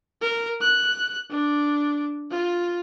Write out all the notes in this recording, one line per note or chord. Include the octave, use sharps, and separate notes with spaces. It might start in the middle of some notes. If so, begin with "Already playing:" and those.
A#4
F#6
D4
F4